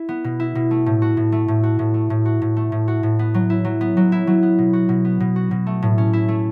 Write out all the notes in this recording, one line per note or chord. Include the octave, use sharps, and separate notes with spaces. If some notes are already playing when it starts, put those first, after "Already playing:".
Already playing: E4
B3
B2
E4
B2
A3
A2
F#4
A2
A3
A2
F#4
A2
A3
A2
F#4
A2
A3
A2
F#4
A2
B3
F#3
E4
F#3
B3
F#3
E4
F#3
B3
B2
F#4
B2
B3
B2
F#4
B2
A3
A2
C#4
E4
A3